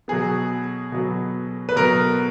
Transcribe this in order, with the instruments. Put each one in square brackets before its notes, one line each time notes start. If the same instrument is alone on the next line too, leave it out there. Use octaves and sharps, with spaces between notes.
[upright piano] B2 F#3 B3 G#4
B2 F#3 B3
B4
B2 F#3 B3 A#4